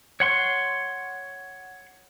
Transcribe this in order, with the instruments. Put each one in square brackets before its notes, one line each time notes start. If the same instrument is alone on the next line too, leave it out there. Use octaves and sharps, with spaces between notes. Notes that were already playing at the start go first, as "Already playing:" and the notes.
[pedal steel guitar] C#5 F#5 C6 C#6